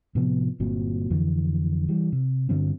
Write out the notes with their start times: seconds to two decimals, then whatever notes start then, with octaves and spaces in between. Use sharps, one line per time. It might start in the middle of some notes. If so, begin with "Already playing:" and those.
0.15 A2 C3 F3 B3
0.60 G1 A#2 F#3 C4
1.10 F2 D3 E3
1.89 E3 G3
2.12 C3
2.49 G2 D3 F#3 C4